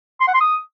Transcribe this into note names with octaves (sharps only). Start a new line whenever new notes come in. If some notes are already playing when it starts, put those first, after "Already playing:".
C6
F#5
C6
D#6